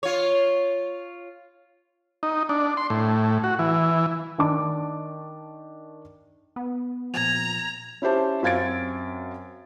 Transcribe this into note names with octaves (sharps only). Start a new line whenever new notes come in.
F4 C#5
D#4
D4
C6
A2
F#4
E3
D#3 D4 A5 D6
B3
A#2 F3 A#5 G#6 F7
C#4 E4 G4 C5 A5
F#2 C4 F5 G#6 A6 D7